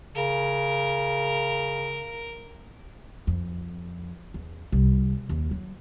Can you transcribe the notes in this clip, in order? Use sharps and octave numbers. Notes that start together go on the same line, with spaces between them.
C#3 A#4
F2
E2
C2
D#2
F#3